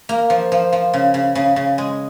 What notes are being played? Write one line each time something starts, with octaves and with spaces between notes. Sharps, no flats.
A#3
F3
F3
F3
C#3
C#3
C#3
C#3
G#3